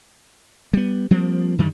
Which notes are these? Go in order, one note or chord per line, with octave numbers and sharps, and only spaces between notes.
G3 B3
F3 G3 A#3 C4
F#2 D3 D#3 G3